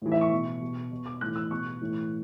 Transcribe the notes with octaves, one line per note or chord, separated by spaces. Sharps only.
A2 E3
E5
C#6
B2
B2
B2
D6
A2 E3 F#6
E6
B2 C#6
A2 E3